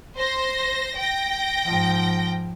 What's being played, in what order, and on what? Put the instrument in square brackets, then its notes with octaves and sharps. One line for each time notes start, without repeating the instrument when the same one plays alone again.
[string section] C5 A#6
G5 A#6
[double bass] G#2 F3